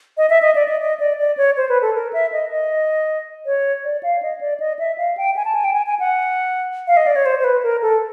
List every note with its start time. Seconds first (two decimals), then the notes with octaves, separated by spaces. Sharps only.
0.18 D#5
0.30 E5
0.42 D#5
0.55 D5
0.68 D#5
0.81 D#5
1.00 D5
1.19 D5
1.37 C#5
1.57 C5
1.69 B4
1.82 A4
1.95 A#4
2.13 E5
2.32 D#5
2.52 D#5
3.46 C#5
3.84 D5
4.03 F5
4.23 D#5
4.41 D5
4.60 D#5
4.79 E5
4.98 F5
5.17 G5
5.36 G#5
5.45 A5
5.55 G#5
5.64 G5
5.74 G#5
5.86 G#5
6.00 F#5
6.87 F5
6.97 D#5
7.07 D5
7.16 C#5
7.26 C5
7.39 C5
7.44 B4
7.63 A#4
7.82 A4